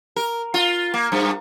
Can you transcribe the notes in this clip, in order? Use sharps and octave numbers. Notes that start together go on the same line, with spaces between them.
A#4
F4
A#3
G2